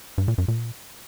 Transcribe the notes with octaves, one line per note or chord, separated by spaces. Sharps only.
G2
A#2
F#2
A#2